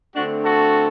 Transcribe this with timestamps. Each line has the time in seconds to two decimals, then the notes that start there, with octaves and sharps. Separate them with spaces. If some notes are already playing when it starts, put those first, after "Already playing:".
0.15 D3 A3 C4 D4 F#4
0.45 F#4 A4